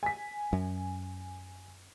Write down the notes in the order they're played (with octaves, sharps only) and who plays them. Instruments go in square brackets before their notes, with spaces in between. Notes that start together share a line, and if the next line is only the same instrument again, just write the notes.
[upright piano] G#5 B6
[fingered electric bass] F#2